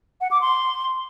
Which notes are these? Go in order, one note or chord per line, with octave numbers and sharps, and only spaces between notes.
F#5
D6
C6